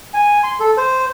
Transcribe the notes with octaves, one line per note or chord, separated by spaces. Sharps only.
G#5
C6
A4
C5